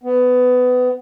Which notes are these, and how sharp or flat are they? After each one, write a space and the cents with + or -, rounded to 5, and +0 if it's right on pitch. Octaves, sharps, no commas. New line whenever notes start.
B3 +20